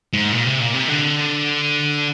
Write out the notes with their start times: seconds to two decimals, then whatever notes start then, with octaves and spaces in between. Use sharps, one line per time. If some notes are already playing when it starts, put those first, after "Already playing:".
0.13 G#2
0.32 A#2
0.46 C3
0.60 A#2
0.74 C3
0.88 D3